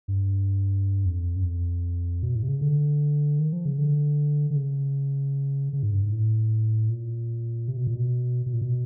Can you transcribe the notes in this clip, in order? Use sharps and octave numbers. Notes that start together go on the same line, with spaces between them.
G2
F2
F#2
F2
B2
A2
C3
C#3
D3
D#3
F3
C#3
D3
D3
C#3
C#3
G#2
G2
G#2
A2
A#2
C3
B2
A#2
B2
B2
A#2
B2